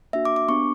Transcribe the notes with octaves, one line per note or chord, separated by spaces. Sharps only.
A#3 D4 F#4 E5
D6
D6
B3 D4 G4 C#6